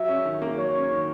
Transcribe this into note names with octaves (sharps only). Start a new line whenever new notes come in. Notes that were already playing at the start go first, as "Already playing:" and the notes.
Already playing: F#3 E5
C#4
D#3
A#3
F#3 C#5
C#4
D#3